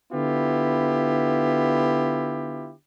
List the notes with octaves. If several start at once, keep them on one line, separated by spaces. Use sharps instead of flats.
D3 B3 E4 F4 G4